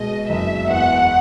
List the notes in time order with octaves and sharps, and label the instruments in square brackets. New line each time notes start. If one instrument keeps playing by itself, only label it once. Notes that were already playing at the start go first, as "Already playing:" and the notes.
Already playing: [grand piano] B2 G#3 [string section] D#5
[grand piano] F#1 [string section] E5
[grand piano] E2 [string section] F#5